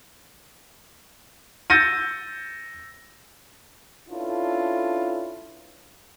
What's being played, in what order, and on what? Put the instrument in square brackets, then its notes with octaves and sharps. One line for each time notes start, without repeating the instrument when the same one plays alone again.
[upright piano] E6 G6 A6 A#6 C#7 D#7
[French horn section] C#4 D4 E4 F4 A4 B4